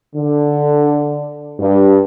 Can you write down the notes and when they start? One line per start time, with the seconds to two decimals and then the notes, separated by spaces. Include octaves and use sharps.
0.14 D3
1.59 G2